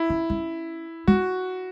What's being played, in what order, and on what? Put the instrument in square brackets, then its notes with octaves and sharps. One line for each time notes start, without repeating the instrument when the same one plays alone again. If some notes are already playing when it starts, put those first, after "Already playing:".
Already playing: [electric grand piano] E4
[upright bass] C#4
C#4
[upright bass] B3 [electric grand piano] F#4